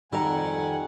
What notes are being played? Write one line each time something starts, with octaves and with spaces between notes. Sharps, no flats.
F2 D#3 G3 A4 F#5 G#5 A#5